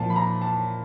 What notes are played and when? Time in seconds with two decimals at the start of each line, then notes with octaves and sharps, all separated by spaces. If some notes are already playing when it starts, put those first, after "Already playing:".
Already playing: A#2 F3 A5
0.10 B5
0.16 A#5
0.42 A5